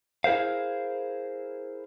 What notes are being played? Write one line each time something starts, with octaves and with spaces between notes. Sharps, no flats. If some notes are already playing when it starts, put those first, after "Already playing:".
E4 G#4 A#4 C5 F5